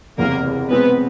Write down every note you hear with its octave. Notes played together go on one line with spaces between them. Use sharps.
F#1 E2 C3 A#3 A#4
B2 G#3 B3 C4 B4